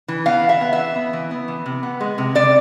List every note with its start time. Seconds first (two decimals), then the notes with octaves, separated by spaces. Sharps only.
0.08 E3
0.26 B3 F5
0.43 E3
0.49 E5
0.61 B3
0.73 E5
0.78 E3
0.96 B3
1.13 E3
1.31 B3
1.48 E3
1.66 C3
1.83 B3
2.01 G#3
2.18 C3
2.35 C3 D5